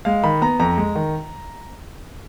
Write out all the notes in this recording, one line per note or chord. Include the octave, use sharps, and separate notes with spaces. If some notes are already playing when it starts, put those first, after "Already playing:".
G#3 F5
D#3 B5
B3 A#5
F2 A#5
G#3
D#3